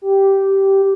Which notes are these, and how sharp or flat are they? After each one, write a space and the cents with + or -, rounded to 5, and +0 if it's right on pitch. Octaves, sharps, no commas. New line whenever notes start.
G4 -10